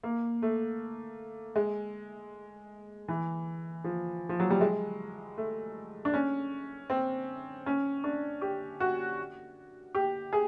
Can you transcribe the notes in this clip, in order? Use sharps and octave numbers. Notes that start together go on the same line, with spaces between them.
A#3
A3
G#3
E3
F3
F3
F#3
G3
G#3
A3
D4
C#4
C4
C#4
D4
G4
F#4
G4
G#4